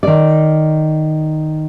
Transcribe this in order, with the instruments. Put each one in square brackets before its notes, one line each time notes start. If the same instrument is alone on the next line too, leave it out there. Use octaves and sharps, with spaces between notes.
[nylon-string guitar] D#3 D5